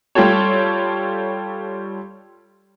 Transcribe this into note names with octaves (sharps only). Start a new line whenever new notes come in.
G3 F4 G4 A4 C#5